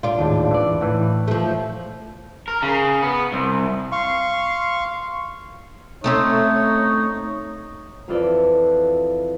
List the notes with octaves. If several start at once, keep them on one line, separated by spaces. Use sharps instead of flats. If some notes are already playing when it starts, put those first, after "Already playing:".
D4 F4
G#1 D#2 A2
E3 D5
A2 E3
F3 A3
A#4
C#3
B3
C2
F5 C6 C#6
A3 C4 C#4 D#4 C#5
F2 E3 F4 A4 B4 D5